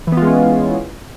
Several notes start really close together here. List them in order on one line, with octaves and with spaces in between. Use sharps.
E3 B3 F4 G#3 C#4